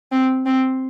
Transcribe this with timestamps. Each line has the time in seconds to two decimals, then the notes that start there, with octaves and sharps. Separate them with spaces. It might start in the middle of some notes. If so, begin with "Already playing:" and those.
0.12 C4
0.46 C4